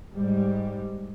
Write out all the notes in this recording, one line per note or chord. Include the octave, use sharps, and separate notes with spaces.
G#2 G3